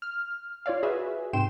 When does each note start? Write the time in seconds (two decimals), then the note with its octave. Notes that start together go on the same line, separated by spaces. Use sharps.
0.02 F6
0.66 F4 C#5 D5 F5
0.83 F#4 G#4 B4 E5
1.33 G#2 C3 G5 C6 E7